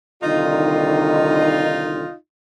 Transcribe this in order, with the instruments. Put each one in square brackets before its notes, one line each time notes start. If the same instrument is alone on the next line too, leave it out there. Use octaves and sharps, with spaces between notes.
[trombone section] C2 D3 D#3 [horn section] D#4 F4